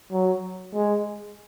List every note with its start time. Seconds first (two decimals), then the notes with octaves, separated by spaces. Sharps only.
0.12 F#3
0.75 G#3